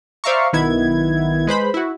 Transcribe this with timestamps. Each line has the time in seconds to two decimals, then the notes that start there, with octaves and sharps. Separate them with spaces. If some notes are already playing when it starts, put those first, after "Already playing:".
0.24 C5 D5 E5 F5 A#5 C#6
0.53 B1 D#3 B3 E4 G#6
1.47 G#3 B4 C5 B5
1.74 E4 F#4